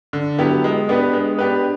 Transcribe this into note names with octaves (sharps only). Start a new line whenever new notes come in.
D3
F#3 B3 E4 G4
G#3
B3 D4 G4 B4
G#3
B3 D4 G4 B4